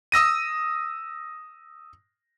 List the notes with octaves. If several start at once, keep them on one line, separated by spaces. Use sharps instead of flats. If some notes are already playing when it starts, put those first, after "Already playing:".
D#6 E6 A#6 D#7